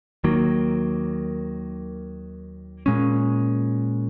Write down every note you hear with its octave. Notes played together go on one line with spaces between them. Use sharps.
D#2 D#3 F#3 A#3
A#2 G#3 C#4